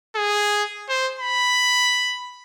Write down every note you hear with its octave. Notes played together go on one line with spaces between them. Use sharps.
G#4
C5
B5